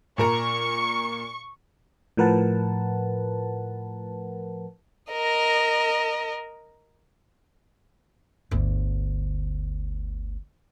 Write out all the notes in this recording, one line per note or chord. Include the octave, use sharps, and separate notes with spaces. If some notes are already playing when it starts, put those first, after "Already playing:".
A#2 A#4 A#5 C#6
A2 F3 A#4 B4 F#5 A5
A#4 D#5
G1 D2